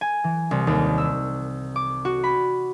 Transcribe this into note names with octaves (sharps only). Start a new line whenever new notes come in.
G#5
E3
C2
D#2
E6
D6
F#4
B5